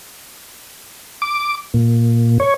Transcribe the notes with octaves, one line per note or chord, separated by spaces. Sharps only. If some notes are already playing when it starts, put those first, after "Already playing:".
D6
A#2
C#5